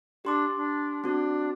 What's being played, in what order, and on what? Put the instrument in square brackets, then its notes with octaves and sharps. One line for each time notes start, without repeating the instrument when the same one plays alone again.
[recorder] D4 [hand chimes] G4 C6 D6
[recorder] D4
[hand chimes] C4 F#4 [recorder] D4